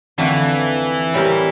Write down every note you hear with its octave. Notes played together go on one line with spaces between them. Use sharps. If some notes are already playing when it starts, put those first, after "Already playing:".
F2 D3 E3 A3
A2 G3 C4 G4 A#4